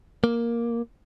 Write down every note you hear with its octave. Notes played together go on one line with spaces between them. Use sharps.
A#3